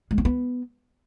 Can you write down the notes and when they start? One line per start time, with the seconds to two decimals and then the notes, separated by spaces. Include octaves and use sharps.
0.11 G#3
0.18 C4
0.25 B3